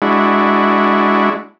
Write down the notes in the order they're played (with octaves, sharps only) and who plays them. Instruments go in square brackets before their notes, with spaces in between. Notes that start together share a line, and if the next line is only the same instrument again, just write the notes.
[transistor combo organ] G#3 D4 E4 F#4